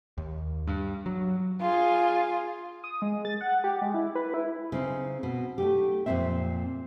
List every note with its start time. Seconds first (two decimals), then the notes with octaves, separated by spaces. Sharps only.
0.18 D#2
0.67 G2
1.06 F#3
1.61 F4 G#4
2.84 D#6
3.02 G#3
3.25 A6
3.41 F#5
3.64 G4
3.82 G#3
3.94 E4
4.15 B4
4.34 E4
4.72 C#3 C4 D#4
5.23 B2
5.58 A3 D#4 G4
6.06 F2 A#2 E3 F3 C4 E5